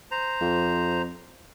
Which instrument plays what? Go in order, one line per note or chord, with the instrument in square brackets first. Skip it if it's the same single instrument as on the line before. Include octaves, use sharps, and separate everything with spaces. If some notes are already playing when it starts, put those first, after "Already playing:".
[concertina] C5 A#5
[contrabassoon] F2